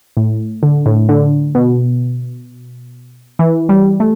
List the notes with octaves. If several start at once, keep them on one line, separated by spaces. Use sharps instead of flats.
A2
D3
A2
D3
B2
E3
G3
A3